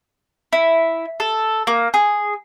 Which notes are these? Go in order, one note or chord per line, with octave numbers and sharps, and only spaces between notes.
E4
A4
A#3
G#4